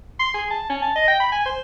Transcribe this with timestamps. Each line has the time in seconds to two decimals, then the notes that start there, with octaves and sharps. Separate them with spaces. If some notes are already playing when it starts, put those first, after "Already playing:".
0.19 C6
0.34 G#4
0.51 A5
0.70 C#4
0.82 A5
0.96 D#5
1.08 G5
1.20 B5
1.32 G#5
1.46 C5